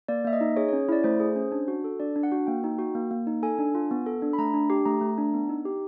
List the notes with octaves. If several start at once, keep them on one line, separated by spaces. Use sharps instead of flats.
A#3 D5
A#3 E5
D#5
D#4
G#4 C#5
C#5
C#4
E4 D5
A3 C5
G#4
C#4
D4
F#4
A4
D4 D5
D4
F#5
F#4
A#3 G5
D#4
F#4
A#3
A#3
D#4
A4 G#5
D4
F4
B3
A4
D4
B5
A3 A#5
D4
G4
A3 A#5
A3
D4
B3
D#4
G4